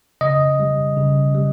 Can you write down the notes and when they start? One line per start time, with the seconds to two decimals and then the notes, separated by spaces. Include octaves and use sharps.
0.21 C#3 D#5
0.60 G3
0.97 C#3
1.35 G3